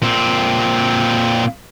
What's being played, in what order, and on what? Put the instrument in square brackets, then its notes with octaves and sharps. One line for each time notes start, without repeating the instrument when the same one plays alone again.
[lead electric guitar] A#2 C4